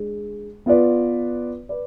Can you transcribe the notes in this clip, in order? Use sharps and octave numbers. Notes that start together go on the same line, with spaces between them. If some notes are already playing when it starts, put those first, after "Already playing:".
Already playing: G#3 D4 G#4
B3 F4 B4 D5
B4 D5